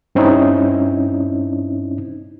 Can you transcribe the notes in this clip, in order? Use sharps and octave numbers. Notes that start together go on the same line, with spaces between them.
G2 C4 C#4 D#4 E4